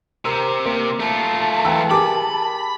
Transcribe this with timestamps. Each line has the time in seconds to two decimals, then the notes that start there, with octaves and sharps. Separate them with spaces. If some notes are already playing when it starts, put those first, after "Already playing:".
0.25 C3 A#4 E6
0.66 C3 A#3
1.00 A3 F4 A5
1.65 E3 G5 A#5 E6
1.91 G4 G#4 A#4 B5 D6